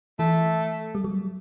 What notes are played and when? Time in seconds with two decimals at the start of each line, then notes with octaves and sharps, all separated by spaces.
0.19 E3 A3
0.95 G3
1.04 F#3